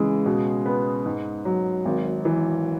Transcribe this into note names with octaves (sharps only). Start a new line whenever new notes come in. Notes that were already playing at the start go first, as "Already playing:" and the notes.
Already playing: C#3 E3 G#3
B2
B3
G#2
F#3
G#1
E3